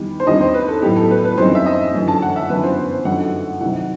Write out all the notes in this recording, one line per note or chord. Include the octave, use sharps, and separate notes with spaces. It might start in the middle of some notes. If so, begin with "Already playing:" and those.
Already playing: E2 D#3 G3 B3
C5
D#2 D#3 G3 C4 D#4 D#5
C5
B4
A4
A2 F#3 B3 G4
A4
B4
B4
F#2 E3 G3 C4 D#4 C5
E5
D#5
G1 F#2 E3 A3
A5
F#5
E5
G1 F#2 E3 B3 B4
C5
C5
C5
G1 F#2 F#3 A3 D#4 F#5
C2 C3 D#3 F#3 F#5